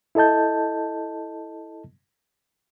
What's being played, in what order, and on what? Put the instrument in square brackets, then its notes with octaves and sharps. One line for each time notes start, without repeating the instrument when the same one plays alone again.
[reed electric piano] E4 A4 D#5 A5 G6